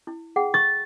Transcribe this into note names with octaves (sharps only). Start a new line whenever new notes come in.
E4
G#4 F#5 G5
C#6 A6